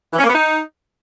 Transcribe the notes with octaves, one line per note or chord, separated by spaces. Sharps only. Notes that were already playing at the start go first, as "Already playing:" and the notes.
E3
C#4
A#3
B3
D#4